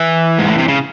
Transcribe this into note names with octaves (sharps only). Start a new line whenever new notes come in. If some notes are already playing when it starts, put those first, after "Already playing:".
Already playing: E3
G#2
A2
C3
C#3